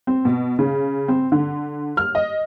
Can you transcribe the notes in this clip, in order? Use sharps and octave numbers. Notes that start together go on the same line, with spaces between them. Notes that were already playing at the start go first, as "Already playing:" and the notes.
C4
B2
C#3
C4
D3
F6
D#5